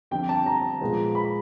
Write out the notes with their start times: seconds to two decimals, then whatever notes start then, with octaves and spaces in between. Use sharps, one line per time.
0.11 F2 D3 G3 G5
0.29 A5
0.46 A#5
0.81 A#2 F3 G#3 B3
1.15 B5